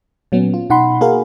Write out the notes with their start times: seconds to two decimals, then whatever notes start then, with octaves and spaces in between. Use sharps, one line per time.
0.32 A#2 F#3 B3 C#4
0.54 F4
0.70 B2 D#4 F#5 B5 C6
1.01 A#3 F#4 G#4 A#4 F5